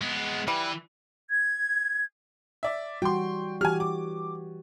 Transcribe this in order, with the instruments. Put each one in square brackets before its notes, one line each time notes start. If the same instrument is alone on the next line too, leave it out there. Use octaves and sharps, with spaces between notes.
[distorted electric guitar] G#3 B3
[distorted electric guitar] E3 B4 [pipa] G3
[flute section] G#6
[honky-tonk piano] D5 E5
[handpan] E3 G3 F#4 [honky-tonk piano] G5 C6
[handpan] E3 F#4 G4 [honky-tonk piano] G#5 F6
[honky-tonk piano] D6